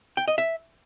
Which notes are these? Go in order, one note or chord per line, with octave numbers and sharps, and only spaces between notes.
G5
D#5
E5